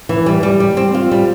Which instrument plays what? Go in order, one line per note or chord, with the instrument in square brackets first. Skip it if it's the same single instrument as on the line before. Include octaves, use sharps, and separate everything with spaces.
[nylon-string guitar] E3
G3
G3
G3
C4
F4
G3